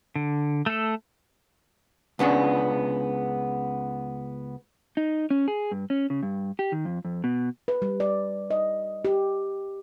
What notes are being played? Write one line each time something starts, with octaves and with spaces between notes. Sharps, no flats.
D3
A3 A4
C#2 B3 C#4 D4
D#4
C#4
G#4
G2
C#4
C#3
G2
G4
D#3
F2
F2
B2
B4
G3
D5
D#5
G4